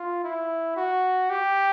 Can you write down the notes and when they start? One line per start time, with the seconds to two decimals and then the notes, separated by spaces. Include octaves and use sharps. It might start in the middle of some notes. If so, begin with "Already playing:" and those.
Already playing: F4
0.24 E4
0.76 F#4
1.30 G4